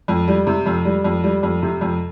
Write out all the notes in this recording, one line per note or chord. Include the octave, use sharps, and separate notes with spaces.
F2
G3
C3
F2
G3
F2
G3
F2
C3
F2